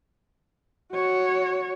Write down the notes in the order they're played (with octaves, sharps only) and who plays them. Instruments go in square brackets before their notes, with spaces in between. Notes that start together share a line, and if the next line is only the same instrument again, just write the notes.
[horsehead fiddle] F#4 C#5